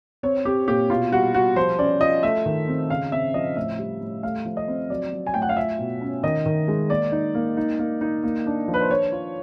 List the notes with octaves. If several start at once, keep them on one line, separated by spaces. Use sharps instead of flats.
C4 C#5
C4 G4
A#2 G4
B2 F4
G3 F#4
G3 F#4
F3 C5
C#4 D5
F4 D#5
A3 E5
D#3
C4
C#3 F5
C4 E5
F3 D#5
A2 E5
G3
A2
A3 F5
F3
D#5
C4
F#3 D5
F#3
G#5
A2 G5
F#5
F5
F4 E5
B2
C#4
D#3 D#5
D#3
G#3
A#3 D5
D#4
A#3
D#4
A#3
D#4
A#3
D4
F3
B4
C5
D4 C#5
F4